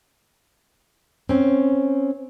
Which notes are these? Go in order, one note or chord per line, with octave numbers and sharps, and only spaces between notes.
C4 C#4